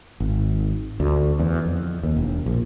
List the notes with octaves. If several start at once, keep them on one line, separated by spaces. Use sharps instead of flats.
G#1
D2
E2
F2
D#2
E1
A#1